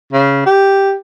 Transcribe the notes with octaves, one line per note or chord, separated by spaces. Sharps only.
C#3
G4